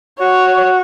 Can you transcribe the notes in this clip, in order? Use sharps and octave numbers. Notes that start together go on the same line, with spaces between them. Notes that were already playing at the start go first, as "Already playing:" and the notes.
F#4 C#5